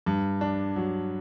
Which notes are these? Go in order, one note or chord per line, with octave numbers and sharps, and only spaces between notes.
G2
D4
F#3